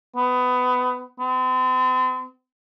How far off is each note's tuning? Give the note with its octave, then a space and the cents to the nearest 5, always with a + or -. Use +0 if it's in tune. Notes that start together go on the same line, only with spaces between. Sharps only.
B3 +20
C4 -40